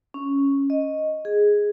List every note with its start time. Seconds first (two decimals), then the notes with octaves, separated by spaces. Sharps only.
0.14 C#4
0.70 D#5
1.25 G#4